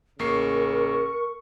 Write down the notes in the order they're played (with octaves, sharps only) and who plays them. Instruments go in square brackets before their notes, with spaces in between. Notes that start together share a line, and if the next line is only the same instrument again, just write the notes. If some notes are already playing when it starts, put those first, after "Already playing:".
[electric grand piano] A1 A#3 C7 [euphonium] C#3 [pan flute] A#4 [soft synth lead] C#6